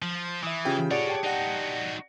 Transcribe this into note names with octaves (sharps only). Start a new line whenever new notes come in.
F3
E3 E5 D#6
C#3 F4 G4 G5
G#4 A4 C#5 D5 F#5 D7
G4 G5 A5
D#4 F#4 D5 F#5 A#6